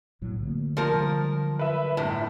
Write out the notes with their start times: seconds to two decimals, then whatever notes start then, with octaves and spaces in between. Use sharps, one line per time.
0.21 B1 A2 F#3
0.40 D3 A3 A#3
0.77 F3 A#4
0.93 D3 F#3 G3
1.59 B4 E5
1.97 G1 A2